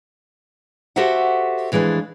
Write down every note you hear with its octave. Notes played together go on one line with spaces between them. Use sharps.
F#4 G4 A4 C5 E5 F#5
F2 E3 G#3 C#4 D4